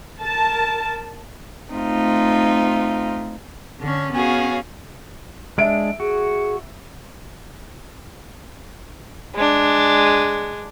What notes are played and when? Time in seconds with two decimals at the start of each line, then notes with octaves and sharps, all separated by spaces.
0.21 A#4 A5
1.72 A3 C4 D#4 F4
3.81 D3 C#4
4.12 B3 C#4 F#4 G#4 F5
5.58 G#3 D4 E5 D7
6.00 F#4 G#4
9.35 G#3 D4